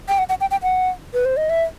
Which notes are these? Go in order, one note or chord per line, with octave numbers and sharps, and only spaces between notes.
G5
F#5
F#5
G5
G5
F#5
B4
C5
D#5
E5